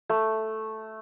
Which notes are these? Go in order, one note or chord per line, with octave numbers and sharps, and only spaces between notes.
A3